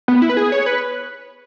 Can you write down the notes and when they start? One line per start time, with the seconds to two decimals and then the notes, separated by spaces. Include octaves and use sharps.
0.08 B3
0.22 E4
0.29 B4
0.37 G#4
0.52 C#5
0.66 B4